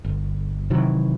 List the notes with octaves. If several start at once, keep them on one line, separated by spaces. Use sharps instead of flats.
G1
C3 D#3 E3 F#3